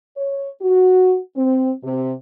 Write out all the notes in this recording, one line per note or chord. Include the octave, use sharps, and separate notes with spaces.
C#5
F#4
C4
C3